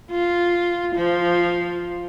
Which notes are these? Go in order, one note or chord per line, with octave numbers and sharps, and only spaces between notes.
F4
F3